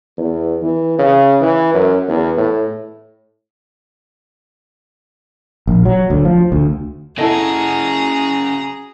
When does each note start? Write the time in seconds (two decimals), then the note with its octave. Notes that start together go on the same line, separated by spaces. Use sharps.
0.18 E2
0.62 E3
0.99 C#3
1.41 E3
1.74 F#2
2.08 E2
2.37 A2
5.67 A#1
5.85 F#3
6.10 D2
6.25 F3
6.52 D2
7.18 C#3 E4 F#4 G#4 A4 D#5 A#5